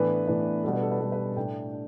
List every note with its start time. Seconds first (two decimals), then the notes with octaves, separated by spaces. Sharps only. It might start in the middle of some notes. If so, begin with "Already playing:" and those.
Already playing: A2 E3 B3 D4 B4
0.27 A2 E3 B3 D4
0.63 B2 G3 D4 A4
0.73 B4
0.82 A4
0.91 B4
1.00 B2 G3 D4 A4
1.12 B4
1.36 A2 A3 D4 G5
1.73 D4